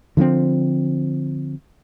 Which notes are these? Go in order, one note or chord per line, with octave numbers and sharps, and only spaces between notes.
D3 F3 B3 C4